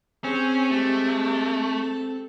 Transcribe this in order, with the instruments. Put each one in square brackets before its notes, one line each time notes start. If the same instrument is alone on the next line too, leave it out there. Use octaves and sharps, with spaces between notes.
[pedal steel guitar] C4 [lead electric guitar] C#4 [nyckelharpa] G#4
[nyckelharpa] G#3 G4 [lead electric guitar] A3
[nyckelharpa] A4